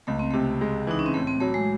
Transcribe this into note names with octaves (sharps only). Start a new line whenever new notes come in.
C#2 A3
C4
C3 A3
G#3
E3 D#4
C#4
C4
A2 A3
C4
F#3 A3
G#3